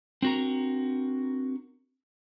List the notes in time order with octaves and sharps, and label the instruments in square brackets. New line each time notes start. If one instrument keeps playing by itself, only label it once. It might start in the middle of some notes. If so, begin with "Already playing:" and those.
[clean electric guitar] C4 D4 F#4 A#4 A#5